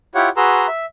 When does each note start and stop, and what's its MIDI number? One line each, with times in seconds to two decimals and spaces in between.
0.15 0.29 64
0.15 0.29 65
0.15 0.29 67
0.15 0.29 73
0.15 0.29 78
0.37 0.67 66
0.37 0.67 68
0.37 0.67 71
0.37 0.67 82
0.37 0.67 84
0.37 0.67 88
0.68 0.86 76